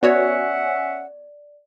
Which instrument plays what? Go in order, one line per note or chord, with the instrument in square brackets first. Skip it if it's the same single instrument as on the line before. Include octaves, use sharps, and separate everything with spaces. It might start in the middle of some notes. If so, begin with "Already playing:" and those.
[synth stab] B3 F#4 C#5 [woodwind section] C#4 E5 F#5 [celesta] D5